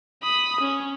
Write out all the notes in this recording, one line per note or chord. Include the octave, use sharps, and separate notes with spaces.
B5 D#6
C#4